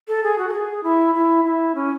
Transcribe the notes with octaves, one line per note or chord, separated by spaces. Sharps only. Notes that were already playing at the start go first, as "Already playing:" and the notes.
A4
G#4
F#4
A4
G#4
E4
E4
E4
C#4